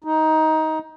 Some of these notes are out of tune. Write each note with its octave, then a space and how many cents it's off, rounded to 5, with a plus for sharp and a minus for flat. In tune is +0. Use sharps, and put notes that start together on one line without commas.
D#4 +15